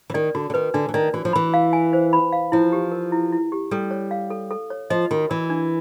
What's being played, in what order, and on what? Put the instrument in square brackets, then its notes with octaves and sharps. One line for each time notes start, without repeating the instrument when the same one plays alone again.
[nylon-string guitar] E3
[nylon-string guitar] D#3 [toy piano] D5
[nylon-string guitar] D3 [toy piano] F#4
[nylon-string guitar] D3
[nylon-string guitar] D#3 [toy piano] B4
[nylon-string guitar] D3 [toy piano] D4
[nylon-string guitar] E3
[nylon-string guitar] D#3 [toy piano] D5
[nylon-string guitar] E3 [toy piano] F#4
[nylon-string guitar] F3
[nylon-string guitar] E3 [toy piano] B5
[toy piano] F5
G#5
C5
B5
F5
[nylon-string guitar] F3 [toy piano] E4
[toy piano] G4
A#4
E4
E4
G4
[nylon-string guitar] G3 [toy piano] A4
[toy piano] C#5
F5
A4
A4
C#5
[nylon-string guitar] F3 [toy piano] D#5
[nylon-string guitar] D#3 [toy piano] F#4
[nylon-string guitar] E3 [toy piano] A#4
[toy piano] D4